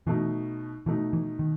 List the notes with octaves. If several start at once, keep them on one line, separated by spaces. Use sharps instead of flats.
B2 E3 A3 D#4
B2 E3 A3 D#4
E3
D#3